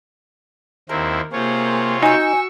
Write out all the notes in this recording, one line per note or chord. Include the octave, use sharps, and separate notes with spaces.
D#2 C4 E4 A#4
C3 A#3 F4 G#4 C5 C#5
D#4 F#4 G#5 C#6 E6 G6